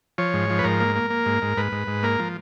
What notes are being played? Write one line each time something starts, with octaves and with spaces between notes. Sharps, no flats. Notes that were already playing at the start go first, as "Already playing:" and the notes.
F3 C#5
G#2
F3
B4
G#2 A#4
A#3
A#3
A#3
G#2
G#2
G#2 B4
G#2
G#2
A#3 A#4
F3